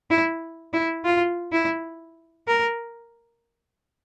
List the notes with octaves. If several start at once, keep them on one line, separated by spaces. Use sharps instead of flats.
E4
E4
F4
E4
A#4